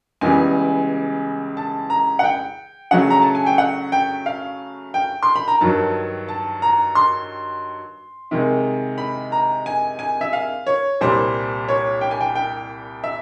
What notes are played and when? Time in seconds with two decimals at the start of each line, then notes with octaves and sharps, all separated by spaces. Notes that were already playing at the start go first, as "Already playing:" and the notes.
0.21 C#2 C#3 E3 G3 B3 G#5
1.57 A5
1.90 A#5
2.19 F#5
2.24 G5
2.91 C#3 F#3 A3 F#5
3.10 A#5
3.22 A5
3.35 G#5
3.46 G5
3.58 F#5
3.92 G5
4.26 F5
4.94 G5
5.23 C6
5.36 B5
5.48 A#5
5.61 G2 D#3 F#3 A5
6.28 A5
6.62 A#5
6.95 C6
8.31 C3 D#3 G#3
8.98 B5
9.32 A#5
9.66 G#5
9.99 G#5
10.21 E5
10.33 F5
10.67 C#5
11.01 C2 A#2 G3 C5
11.68 C#5
12.01 G5
12.11 G#5
12.20 G5
12.35 G5
13.04 E5